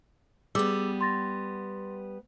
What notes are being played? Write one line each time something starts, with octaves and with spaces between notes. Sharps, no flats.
G3 B3 G#4 D6 E6
C6 A6 A#6